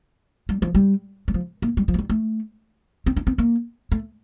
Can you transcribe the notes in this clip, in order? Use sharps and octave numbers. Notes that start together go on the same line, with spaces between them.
G3
F3
G3
G3
F3
A#3
G3
F3
A3
G3
A3
C4
D4
C4
A#3
A3